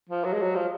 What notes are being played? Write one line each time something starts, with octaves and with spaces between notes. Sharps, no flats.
F3
F#3
G#3
F#3
F3